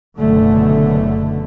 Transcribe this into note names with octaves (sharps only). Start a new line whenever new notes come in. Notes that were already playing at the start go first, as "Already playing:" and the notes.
F#1 F#2 B2 D3 A3